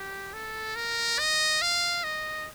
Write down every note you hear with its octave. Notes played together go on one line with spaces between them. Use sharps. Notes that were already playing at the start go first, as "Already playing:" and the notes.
Already playing: G4
A4
A#4
D#5
F5
D#5